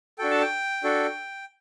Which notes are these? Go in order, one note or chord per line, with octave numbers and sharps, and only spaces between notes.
D4 F#4 A4 G5
A5
G5
D4 F#4 A4